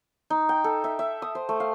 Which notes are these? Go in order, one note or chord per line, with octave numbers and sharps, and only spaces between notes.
D#4
G5
A4
E5
E5
D#6
C5
A3
F5